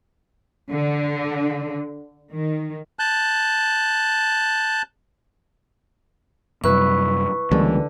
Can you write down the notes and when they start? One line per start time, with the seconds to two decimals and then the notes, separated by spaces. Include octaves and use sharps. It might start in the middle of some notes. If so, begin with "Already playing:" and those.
0.71 D3
2.33 D#3
2.99 A5 F#6 G6
6.64 F#2 C3 G3 E4 B4 C#6
7.51 C#2 D3 E3 G3 A#3